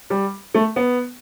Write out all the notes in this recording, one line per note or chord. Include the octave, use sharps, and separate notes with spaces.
G3
A3
B3